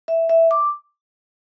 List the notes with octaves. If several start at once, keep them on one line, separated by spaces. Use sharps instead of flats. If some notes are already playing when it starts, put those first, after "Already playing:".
E5
E5
D6